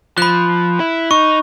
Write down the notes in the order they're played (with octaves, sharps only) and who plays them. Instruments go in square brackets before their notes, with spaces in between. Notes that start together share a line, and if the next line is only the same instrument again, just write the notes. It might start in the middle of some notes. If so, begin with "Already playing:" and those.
[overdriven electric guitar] F3 [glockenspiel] B5 F#6
[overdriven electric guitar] E4
[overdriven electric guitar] D#4 [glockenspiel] C#6